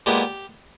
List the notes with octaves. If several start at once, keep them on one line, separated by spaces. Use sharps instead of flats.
A#2 G#3 B3 G4